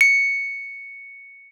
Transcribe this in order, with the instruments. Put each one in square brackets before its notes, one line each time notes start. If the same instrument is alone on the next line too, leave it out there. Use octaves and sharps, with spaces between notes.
[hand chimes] C#7